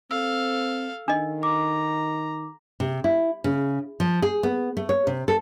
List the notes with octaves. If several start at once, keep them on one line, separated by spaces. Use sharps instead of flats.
C4 A4 F5 E6
D#3 D4 D#5
A#5 D6
C3
E4
C#3
F3
G#4
B3
A3
C#5
C3
A4